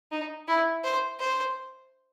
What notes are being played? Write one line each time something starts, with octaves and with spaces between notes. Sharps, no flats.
D#4
E4
C5
C5